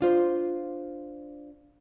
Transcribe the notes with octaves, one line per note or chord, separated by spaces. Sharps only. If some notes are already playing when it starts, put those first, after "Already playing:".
D4 F4 C5